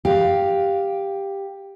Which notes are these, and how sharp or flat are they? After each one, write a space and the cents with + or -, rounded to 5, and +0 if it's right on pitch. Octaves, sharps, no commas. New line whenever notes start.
G4 +5 F5 +0